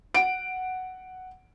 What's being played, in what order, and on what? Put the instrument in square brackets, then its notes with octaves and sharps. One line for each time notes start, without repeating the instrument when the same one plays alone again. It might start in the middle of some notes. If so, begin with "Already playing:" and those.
[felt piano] F#5 D7